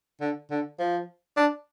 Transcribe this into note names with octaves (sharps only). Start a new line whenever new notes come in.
D3
D3
F3
D4